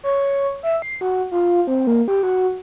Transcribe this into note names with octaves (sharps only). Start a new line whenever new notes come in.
C#5
E5
C7
F#4
F4
C4
A#3
G4
F#4